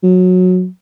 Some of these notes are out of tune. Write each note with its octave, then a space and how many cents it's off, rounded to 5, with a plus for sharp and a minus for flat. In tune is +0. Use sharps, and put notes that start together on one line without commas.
F#3 -20